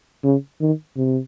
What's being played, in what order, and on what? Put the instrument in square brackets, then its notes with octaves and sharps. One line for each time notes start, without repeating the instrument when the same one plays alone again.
[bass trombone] C#3
D#3
C3